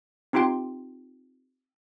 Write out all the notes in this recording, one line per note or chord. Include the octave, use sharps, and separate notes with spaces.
C4 D#4 F4 G4 G5 C6